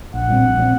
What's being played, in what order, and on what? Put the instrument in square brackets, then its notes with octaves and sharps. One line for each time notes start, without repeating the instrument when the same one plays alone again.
[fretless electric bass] A#1 [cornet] F#5
[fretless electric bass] A#2 G3 C4
A#1
A#2 G3 C4